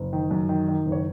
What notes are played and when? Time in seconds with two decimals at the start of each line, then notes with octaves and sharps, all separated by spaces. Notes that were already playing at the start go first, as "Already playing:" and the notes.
Already playing: F#1
0.13 D#3
0.31 F#2
0.49 D#3
0.68 D#3
0.86 F#1
0.92 C#5